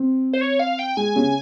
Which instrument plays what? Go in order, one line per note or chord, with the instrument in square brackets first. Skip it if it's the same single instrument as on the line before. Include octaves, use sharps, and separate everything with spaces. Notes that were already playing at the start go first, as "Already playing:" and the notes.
Already playing: [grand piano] C4
[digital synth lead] C5
C#5
F5
G5
[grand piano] G#3 [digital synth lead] G#5
[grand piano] C#3